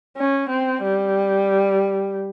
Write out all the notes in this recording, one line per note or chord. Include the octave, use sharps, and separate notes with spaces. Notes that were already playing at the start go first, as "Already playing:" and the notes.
C#4
C4
G3